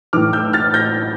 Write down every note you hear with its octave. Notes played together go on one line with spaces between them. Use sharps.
A2 E3 D6 F6
E6 G6
F6 A6
G6 A#6